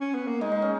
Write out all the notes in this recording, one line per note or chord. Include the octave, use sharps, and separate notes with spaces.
C#4
B3
A#3
G#3 D#4
D#4
C#4